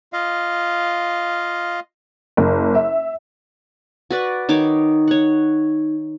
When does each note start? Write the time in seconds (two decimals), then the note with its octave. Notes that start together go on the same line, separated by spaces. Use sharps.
0.13 F4 D#5 F5
2.37 F#1
2.75 E5
4.10 F#4 B4 D5
4.49 D#3 D#4 C#5 D6
5.08 C#5 F#5